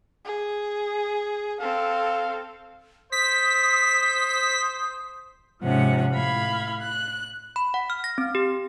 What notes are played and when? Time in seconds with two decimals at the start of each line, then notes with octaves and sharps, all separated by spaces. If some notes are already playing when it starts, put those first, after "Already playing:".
0.25 G#4
1.60 C4 A4 F5
3.12 C5 D#6 B6
5.61 G#2 C3 F3 C#4 F#5
6.13 A2 F5 B5 G#6
6.81 F#6
7.56 B5
7.74 F#5
7.90 F6
8.04 A#6
8.18 C4
8.35 G4